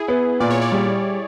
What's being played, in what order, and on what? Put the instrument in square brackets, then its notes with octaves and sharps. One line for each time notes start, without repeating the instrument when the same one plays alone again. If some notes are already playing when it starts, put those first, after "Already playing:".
Already playing: [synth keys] E4 G#4
[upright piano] B3
[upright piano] A#2 [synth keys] D5
[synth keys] C#5
D5
[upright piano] G3